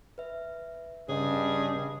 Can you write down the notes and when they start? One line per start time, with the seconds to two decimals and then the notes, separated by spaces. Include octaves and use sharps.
0.18 B4 E5
1.09 G2 C#3 G#4 C#5 D#5